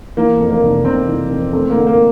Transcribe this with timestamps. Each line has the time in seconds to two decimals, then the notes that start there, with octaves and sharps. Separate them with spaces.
0.17 E3 A#3
0.40 F2
0.50 A#3
0.62 F1
0.85 F1 C4
1.08 E3
1.31 F2
1.53 A3 C4
1.70 A#3
1.76 D3
1.87 A#3